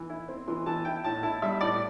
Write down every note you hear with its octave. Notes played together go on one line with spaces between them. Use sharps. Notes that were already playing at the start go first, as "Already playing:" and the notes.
Already playing: E3
E4
C4
E3 C6
E3 A5
E4 G5
A2 A5
E4 A5
G3 E5
A2 D5